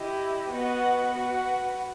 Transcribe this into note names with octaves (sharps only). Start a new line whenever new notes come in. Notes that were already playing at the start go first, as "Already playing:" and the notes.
Already playing: E4 G4 D#5
B3 F#4 B4 D#5 F#5
F#4 B4 F#5